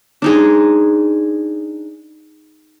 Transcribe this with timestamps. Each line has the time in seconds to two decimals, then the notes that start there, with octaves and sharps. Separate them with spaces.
0.22 D4 D#4 G#4